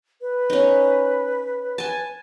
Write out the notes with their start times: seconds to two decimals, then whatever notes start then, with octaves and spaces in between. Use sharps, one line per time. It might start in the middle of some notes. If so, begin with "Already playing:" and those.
0.21 B4
0.50 C#4 D#4
1.78 G#5 A5